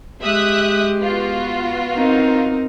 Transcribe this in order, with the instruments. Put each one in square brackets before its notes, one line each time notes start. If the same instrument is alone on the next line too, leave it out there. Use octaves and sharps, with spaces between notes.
[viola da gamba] G#3 G4 [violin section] E5 D#6 F#6
[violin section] B3 F4 F#4
[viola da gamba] C4 D#4 A#4